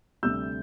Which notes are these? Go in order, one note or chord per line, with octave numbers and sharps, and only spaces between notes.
D2 C3 G3 E6 G6